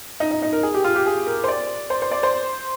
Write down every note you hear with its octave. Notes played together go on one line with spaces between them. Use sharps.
D#4
D#4
D#4
A#4
G#4
G4
F4
G4
G#4
A#4
C5
D5
C5
C5
D5
C5